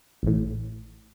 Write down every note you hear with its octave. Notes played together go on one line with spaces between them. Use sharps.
A1 A2